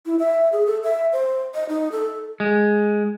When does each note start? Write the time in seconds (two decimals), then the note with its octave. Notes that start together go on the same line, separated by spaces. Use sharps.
0.06 E4
0.19 E5
0.52 G#4
0.67 A4
0.84 E5
1.13 C5
1.54 D#5
1.69 D#4
1.92 A4
2.40 G#3